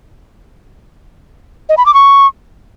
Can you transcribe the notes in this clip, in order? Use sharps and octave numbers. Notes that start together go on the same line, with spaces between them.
D#5
B5
D6
C#6